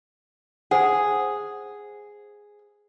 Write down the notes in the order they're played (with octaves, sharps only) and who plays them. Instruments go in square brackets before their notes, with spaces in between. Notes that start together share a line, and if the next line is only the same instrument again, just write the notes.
[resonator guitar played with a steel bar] G#4 [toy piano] C5 F#5